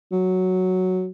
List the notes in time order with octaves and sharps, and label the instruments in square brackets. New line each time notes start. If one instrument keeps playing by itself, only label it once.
[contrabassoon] F#3